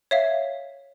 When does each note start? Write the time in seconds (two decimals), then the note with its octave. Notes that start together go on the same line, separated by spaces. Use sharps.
0.11 C#5 E5 F5